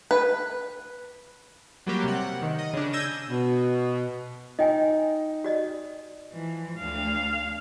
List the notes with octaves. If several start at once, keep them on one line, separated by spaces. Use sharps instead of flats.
B4
F#3 G3 A#3 G4
C3 F#5
D#3
D#5
C#3 D4
E6 G6 G#6 A#6 D#7 E7
B2
D#4 D#5 G5 G#5
F#4 D5 D#5
E3 F3
D2 D4 F5